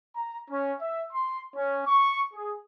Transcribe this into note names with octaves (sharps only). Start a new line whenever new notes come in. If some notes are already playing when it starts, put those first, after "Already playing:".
A#5
C#4
E5
C6
C#4
C#6
G#4